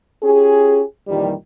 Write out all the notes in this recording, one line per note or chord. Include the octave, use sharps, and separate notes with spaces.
C#4 F4 G4 G#4
F2 A#2 D#3 E3 G3